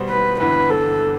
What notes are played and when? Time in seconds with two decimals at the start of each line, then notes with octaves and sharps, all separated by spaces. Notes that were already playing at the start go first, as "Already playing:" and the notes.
Already playing: B2 G3 B3 F#4 C5
0.09 B4
0.40 G1 G2 E3 B3 E4 B4
0.70 A4